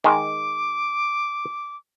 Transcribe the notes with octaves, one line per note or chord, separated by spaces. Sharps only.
D#3 G#3 D6